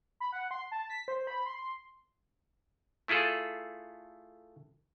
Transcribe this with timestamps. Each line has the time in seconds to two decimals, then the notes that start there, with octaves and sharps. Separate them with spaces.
0.20 B5
0.32 F#5
0.51 C6
0.71 A5
0.90 B6
1.08 C5
1.27 B5
1.46 C6
3.08 A3 E4 F4 G#4 A4